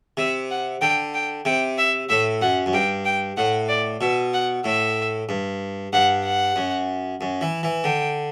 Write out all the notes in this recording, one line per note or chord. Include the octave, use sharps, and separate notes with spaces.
C3 E5
F#5
D3 G5
G5
C3 G5
E5
A2 E5
F#2 F#5
F#2
G2 G5
G5
A2 F#5
D5
B2 E5
F#5
A2 E5
G2
G2 F#5
F#5
F#2
F#2
E3
E3
D3 G5